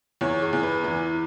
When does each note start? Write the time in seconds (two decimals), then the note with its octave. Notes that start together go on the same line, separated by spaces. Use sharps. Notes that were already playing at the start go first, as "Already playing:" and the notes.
0.21 E2 C#5
0.42 G#4
0.53 E2
0.63 B4
0.84 E3